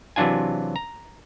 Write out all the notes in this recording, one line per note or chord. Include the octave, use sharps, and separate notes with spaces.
C3 E3 F#3 D4 F4 G#5
A#5